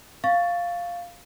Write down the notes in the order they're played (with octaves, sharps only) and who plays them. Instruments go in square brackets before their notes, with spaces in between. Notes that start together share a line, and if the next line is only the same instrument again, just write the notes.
[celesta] F5 C#6 A6